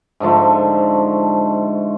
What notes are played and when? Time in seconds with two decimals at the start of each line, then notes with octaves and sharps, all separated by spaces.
0.20 G#2 D3 F3 A3